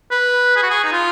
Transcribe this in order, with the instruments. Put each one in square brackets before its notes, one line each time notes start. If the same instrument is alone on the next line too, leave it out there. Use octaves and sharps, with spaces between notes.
[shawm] B4
G#4
F#4
G#4
D#4
F4